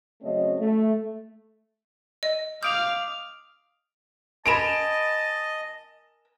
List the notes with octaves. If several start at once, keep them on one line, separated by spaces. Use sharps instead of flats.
C#3 F#3 A3 C4 C#5 D#5
A3
D#5
F5 D6 D#6 G6 D7 F7
A#4 D#5 G#5 A5 B5 D7 E7